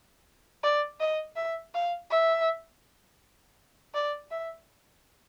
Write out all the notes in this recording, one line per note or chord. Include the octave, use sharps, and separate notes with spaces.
D5
D#5
E5
F5
E5
D5
E5